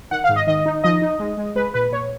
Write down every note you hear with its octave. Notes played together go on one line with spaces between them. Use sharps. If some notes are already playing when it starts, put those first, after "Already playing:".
D#3 F#5
G#2 F5
D#5
D#3 D#5
D#4
F3 D#5
D#4
G#3
G#3
G#3 B4
A#2 B4
A#2 C#5